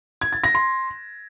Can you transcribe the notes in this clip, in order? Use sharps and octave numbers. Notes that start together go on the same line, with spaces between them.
G#6
A6
A#6
C6